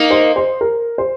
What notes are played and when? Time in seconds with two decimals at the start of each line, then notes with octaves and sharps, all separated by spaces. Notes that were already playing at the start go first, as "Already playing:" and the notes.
Already playing: A#3 D#4
0.11 C5
0.36 C5
0.61 A#4
0.98 C5